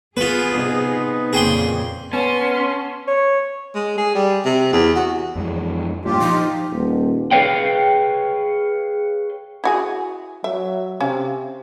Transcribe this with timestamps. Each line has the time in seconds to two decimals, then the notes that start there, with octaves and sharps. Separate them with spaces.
0.17 B3 F4 G#4 B4
0.52 C3 D#4
1.33 F2 A#2 C#3 A#3 G#4 G5 C6
2.13 B3 C#4 A5 C6
3.08 C#5
3.75 G#3
3.98 G#4
4.15 G3
4.45 C3
4.73 E2
4.96 F#4
5.35 F2 E3 G#3
6.05 G2 A#2 F4 G4
6.21 F3 D#4
6.72 D#1
7.31 G#4 A#4 B4 C#5 F5 G5
9.64 E4 F#4 G#4
10.44 F#3 E5
11.00 C3 C#4 F5